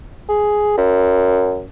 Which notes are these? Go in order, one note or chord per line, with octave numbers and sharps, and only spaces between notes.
G#4
F#2